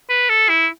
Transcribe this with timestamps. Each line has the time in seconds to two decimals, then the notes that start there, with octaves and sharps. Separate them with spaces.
0.09 B4
0.29 A4
0.49 E4